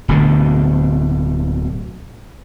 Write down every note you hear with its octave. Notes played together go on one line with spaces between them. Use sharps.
D1 D2 B2 D3